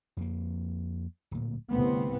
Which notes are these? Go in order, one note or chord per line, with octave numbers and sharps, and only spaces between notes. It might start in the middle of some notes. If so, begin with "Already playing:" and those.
F2 A#3
D1 A#2
C2 D3 A3 B3 C4